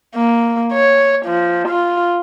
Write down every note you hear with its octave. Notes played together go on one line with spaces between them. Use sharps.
A#3
C#5
F3
F4